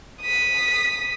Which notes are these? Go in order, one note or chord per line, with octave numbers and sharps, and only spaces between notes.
D#6 B6